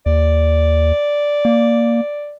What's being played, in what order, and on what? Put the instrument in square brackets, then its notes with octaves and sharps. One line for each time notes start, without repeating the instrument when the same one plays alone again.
[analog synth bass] D#2 [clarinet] D5
[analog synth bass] A#3